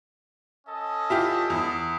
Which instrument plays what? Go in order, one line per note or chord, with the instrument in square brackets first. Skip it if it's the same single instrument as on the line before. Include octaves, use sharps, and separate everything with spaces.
[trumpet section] C#4 A4 D#5
[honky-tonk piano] E4 F4 G4
E2